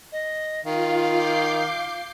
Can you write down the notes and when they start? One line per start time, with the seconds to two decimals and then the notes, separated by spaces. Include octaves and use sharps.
0.12 D#5
0.65 D#3 F4 F5
1.09 D6 G6 C7